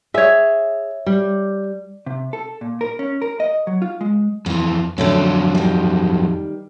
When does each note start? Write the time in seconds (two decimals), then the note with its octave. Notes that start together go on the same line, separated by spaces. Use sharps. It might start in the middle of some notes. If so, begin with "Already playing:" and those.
0.14 G#4 C#5 E5
1.06 G3
2.06 C3
2.33 A4
2.61 A#2
2.81 A#4
2.99 C#4
3.22 A#4
3.40 D#5
3.67 F#3
3.82 F4
4.01 G#3
4.46 F2 E3 F4
4.98 F2 D3 F#3 A3 C#4
5.55 D#3 G3